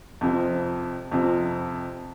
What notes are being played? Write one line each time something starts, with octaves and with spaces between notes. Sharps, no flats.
F2 C3 F3
F2 C3 F3